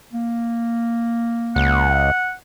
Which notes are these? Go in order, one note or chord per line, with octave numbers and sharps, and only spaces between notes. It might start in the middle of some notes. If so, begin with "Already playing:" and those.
A#3
C#2 F#5